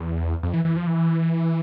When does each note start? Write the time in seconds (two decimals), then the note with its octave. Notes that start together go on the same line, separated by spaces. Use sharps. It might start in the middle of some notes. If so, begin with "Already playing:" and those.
Already playing: E2
0.43 F2
0.54 E3
0.65 E3
0.76 F3
0.87 E3